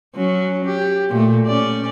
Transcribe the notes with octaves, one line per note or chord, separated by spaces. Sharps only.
F#3 C#4
G4
A#2 A3
C#4 D5